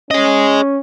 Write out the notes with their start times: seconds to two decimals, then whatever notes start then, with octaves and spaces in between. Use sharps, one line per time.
0.11 C#4 G#4 D#5